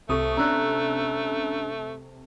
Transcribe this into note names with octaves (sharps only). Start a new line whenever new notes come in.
C2 C3 A3 A4 C#6 D#6
C#4 D4 A#5 E6 F#6